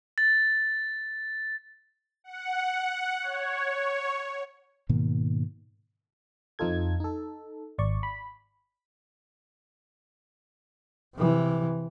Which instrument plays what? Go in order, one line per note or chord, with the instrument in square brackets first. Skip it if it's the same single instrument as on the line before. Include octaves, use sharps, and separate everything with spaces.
[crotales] A6
[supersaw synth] F#5
C#5
[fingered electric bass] G#2 B2 D#3 A#3
[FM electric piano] F2 F3 D#4 F4 A4 G#6
D#4 A4
G#1 D5 C#6
B5
[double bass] C3 E3